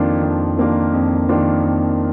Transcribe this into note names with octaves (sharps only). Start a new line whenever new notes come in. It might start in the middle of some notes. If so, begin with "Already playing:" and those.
Already playing: F2 D#3 A#3 D4 F4
F2
D#3 A#3 D4 F4
F2
D#3 A#3 D4 F4
F2